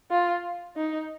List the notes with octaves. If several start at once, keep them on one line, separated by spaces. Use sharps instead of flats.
F4
D#4